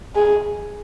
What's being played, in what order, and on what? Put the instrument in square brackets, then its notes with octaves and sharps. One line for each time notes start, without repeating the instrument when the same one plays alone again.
[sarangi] G#4